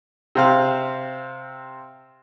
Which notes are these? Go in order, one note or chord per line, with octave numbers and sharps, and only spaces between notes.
C3 C4 F5